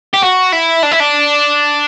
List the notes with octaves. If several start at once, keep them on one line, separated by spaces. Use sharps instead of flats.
G4
F#4
E4
D4
E4
D4